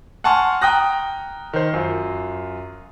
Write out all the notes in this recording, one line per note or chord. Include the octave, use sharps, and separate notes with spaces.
F#5 G#5 A5 C6 C#6 F6
G5 A#5 D#6 F#6 A#6
D#3 C5
F#2 F4